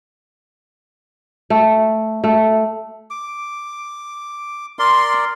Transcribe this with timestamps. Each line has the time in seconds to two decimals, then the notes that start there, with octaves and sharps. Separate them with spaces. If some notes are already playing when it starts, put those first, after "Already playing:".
1.50 A3
2.24 A3
3.11 D6
4.79 A#4 D5 C6